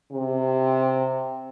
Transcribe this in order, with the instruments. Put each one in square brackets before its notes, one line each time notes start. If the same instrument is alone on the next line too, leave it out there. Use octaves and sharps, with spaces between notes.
[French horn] C3